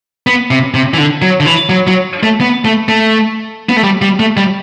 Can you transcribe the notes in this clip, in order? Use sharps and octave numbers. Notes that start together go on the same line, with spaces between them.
B3
C3
C3
E3
D3
F#3
D3
E3
F#3
F#3
A3
B3
A3
A3
B3
A3
G3
G3
A3
G3